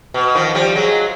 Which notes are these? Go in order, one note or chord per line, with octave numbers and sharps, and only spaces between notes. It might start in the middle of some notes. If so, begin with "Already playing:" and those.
B2
D#3 F3
F3 G3
F#3 G#3